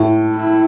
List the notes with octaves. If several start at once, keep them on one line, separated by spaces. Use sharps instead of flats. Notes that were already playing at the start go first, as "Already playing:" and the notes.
Already playing: A2
E4